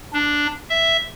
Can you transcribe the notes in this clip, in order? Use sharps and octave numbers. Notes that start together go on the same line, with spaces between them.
D4
E5